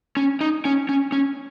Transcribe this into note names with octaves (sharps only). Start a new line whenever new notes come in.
C#4
D#4
C#4
C#4
C#4